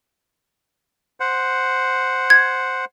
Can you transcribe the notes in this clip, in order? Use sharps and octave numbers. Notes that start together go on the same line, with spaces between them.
C5 F#5
G#6